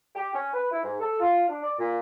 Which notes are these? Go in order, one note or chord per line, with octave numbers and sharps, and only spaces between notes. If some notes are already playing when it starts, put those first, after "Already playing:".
G4
C#4
B4
E4
G#2
A4
F4
D4
D5
A#2